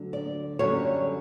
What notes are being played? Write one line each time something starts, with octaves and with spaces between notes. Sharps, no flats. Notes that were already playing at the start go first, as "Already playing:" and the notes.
Already playing: D2 D3 F#3
D5
F#2 D3 G3 C#5